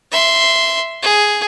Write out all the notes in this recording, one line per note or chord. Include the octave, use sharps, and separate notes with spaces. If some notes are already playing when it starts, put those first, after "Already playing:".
E5 C6
G#4